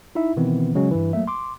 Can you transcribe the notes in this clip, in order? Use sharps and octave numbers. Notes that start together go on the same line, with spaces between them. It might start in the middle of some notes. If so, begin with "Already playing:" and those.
D#4 E4 E5
B2 D#3 E3 B3 C4
C#3 F#3 G#3 C#4
G2 E3
F#3 A3 A#3 E5
C6 D6